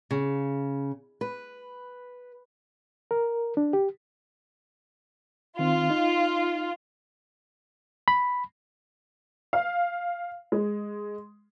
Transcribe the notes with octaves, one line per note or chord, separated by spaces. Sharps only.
C#3
B4
A#4
D4
G4
D#3 C4 F4
D#4
B5
F5
G#3